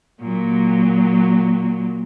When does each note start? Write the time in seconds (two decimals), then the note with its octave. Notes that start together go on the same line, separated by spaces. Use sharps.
0.22 A#2 F#3